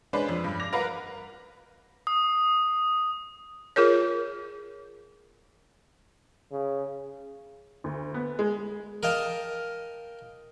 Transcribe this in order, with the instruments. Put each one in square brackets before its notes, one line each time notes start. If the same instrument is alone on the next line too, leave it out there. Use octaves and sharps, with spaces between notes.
[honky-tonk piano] G#3 C#4 D4 B4 C5 D5
F2
G2
D6 A#6 F7
A#4 B4 F5 F#5
[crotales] D#6
[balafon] F4 G#4 A#4 C#5
[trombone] C#3
[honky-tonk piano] D2
B3
G#3
[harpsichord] A#4 D#5 F5 G5 A5